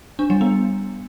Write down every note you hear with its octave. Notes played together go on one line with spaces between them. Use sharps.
D4
G3
B3